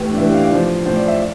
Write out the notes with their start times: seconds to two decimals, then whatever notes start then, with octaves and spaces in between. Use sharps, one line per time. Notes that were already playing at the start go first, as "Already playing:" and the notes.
Already playing: A2 E3 G4
0.12 D4
0.17 A2 E3 E4
0.26 G4
0.34 F5
0.43 D5
0.52 A2 F3 C5
0.86 A2 F3 C5
0.96 D5
1.08 E5